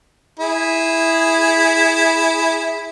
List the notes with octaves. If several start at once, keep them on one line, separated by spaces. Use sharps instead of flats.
E4 G#4